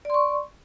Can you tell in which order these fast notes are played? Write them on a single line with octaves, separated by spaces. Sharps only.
D5 C6 C#6